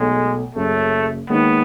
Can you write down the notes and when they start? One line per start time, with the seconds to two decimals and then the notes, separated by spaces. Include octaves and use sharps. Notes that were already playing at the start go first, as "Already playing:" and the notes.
Already playing: B1 B2 G#3 A3
0.55 F#1 F#2 C#3 A3
1.29 D#2 D#3 G#3 B3 D#4